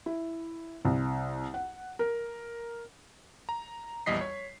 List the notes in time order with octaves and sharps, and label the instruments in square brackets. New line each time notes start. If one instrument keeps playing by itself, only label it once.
[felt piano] E4
C2
F#5
A#4
[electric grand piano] A#5
A#1 E2 G3 D#5 B6 C7
C#5